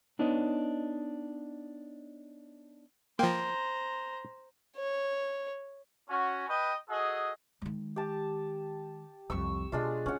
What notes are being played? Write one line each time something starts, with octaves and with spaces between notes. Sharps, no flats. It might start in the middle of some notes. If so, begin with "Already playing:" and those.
B3 D4 D#4 B4 C#5 D#5
F3 A#3 C5 G5 A#5
C#5
C#4 F#4
B4 D#5 G5
F#4 G#4 A4 D#5
D#3 G#3
G4 A5
C2 F2 C#6 E6
B2 G#3 D4 F4
C#4 E4 F#5